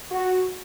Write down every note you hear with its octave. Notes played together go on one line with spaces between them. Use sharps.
F#4